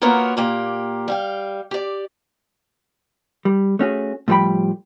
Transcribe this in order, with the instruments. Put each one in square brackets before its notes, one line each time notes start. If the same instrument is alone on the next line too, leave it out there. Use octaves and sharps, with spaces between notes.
[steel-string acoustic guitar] A#3 B3 F4 F#4 A#4 C#5
A#2 A#3 G4
G3 F5 G5
G4 D5
[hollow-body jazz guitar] G3
A3 C#4 F#4 G#4
A2 F3 G3 G#4 G5 B5